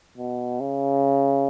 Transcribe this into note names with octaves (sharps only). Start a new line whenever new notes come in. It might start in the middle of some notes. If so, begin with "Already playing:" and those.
B2
C#3